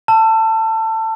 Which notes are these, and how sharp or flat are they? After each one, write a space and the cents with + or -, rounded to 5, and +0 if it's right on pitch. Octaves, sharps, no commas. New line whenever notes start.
A5 +20 E6 +35